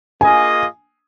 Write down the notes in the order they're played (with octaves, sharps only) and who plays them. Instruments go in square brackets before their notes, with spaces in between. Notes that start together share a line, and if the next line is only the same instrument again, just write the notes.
[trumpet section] A#3 F4 G#4 D#5 [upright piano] G#5